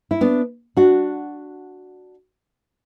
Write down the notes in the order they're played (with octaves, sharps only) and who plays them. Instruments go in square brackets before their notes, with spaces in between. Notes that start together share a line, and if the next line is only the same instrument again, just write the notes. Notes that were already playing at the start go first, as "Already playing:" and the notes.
[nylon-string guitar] E4
B3 D4
D4 F#4